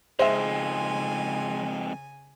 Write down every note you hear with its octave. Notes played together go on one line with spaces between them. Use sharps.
F2 G#2 C#3 G#3 C5 E5 G#5